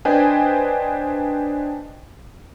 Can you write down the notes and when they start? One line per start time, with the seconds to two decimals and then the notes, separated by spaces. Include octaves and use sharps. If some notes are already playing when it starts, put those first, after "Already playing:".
0.05 D4 B4 C5 D#5 G5 G#5